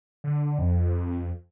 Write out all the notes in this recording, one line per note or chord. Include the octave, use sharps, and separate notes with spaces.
D3
F2